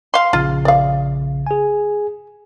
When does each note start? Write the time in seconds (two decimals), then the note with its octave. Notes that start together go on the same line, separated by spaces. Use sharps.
0.14 F5 C6
0.33 A#1 C#3 F4
0.65 D5 F5
1.47 G#4 G#5